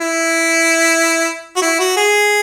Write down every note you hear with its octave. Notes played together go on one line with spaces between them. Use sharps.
E4
F#4
E4
F#4
G#4